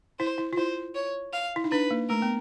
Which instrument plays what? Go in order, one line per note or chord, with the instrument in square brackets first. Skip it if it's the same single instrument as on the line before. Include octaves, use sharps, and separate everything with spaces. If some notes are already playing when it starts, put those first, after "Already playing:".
[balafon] E4 [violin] C5
[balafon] E4
F4
[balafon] E4 [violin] C5
[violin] C#5
F5
[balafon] E4
D#4
[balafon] D4 [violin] B4
[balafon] A#3
[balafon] A3 [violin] A#4
[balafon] B3